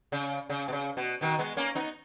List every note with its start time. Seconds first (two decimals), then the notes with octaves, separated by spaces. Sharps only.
0.12 C#3
0.50 C#3
0.68 B2
0.73 C#3
0.97 B2
1.21 B2 D#3
1.39 G#3 B3
1.57 A#3 C#4
1.75 B3 D#4